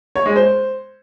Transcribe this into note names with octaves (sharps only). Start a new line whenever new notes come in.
C#5
G#3
C5